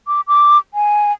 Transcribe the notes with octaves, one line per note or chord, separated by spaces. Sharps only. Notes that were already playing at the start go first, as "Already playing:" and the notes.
D6
D6
G#5